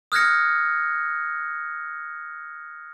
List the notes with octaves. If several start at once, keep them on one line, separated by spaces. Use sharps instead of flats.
D#6 F6 F#6 G#6 A#6 C#7